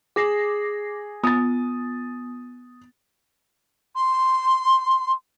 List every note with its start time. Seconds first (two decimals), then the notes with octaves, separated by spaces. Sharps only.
0.16 G#4 D6 A#6 C7
1.24 B3 D#6 A6
3.96 C6